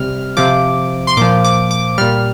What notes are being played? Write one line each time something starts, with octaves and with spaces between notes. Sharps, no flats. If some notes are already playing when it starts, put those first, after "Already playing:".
Already playing: C3 G3 F6
C3 F3 D6
C6
A#2 F3 D6
D6
D6
A#2 G3 F6